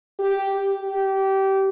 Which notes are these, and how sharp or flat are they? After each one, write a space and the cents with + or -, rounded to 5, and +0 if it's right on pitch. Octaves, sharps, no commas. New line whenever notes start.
G4 -5
G4 -20